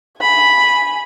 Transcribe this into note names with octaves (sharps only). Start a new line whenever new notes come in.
G#5 B5